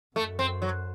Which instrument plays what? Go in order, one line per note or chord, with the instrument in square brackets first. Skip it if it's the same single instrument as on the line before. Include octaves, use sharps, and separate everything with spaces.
[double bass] F#2 [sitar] A3
[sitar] C4
F#3